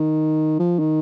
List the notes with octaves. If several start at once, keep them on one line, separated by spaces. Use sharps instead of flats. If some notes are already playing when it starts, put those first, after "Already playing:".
Already playing: D#3
F3
D#3